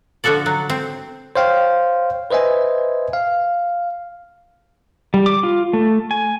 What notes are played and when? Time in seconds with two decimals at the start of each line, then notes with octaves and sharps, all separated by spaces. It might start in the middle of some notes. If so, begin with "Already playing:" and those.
0.24 D3 F3 F#4 A4 D5
0.46 F#3
0.70 C4
1.36 C5 C#5 F5 G5
2.31 B4 C5 D#5 E5 G#5
3.13 F5
5.14 G3
5.26 D6
5.43 F4
5.73 A3
6.11 G#5